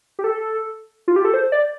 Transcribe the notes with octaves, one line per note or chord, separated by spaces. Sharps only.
G4
A4
F4
G4
A4
C5
D5